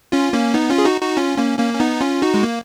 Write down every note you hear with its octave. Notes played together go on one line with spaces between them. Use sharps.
C#4 F4
A#3 C#4
B3 D#4
C#4 F4
G#4
D#4 F#4
D#4 F#4
C#4 F4
A#3 C#4
A#3 C#4
C#4
B3 D#4
C#4 F4
D#4 F#4
G#3
A#3